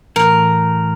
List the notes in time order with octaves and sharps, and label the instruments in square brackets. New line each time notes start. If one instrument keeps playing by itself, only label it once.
[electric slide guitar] A2 E3 A3 [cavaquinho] A#4